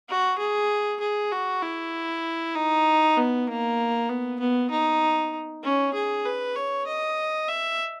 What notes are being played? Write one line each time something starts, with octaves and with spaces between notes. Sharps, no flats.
F#4
G#4
G#4
F#4
E4
D#4
B3
A#3
B3
B3
D#4
C#4
G#4
B4
C#5
D#5
E5